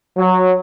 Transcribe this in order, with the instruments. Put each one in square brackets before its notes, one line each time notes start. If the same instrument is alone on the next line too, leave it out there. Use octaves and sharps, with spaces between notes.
[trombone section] F#3